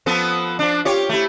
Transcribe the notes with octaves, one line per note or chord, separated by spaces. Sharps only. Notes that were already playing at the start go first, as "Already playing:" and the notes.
F3 B3 A4
F3 D4
F4 G4 C#5
A3 E4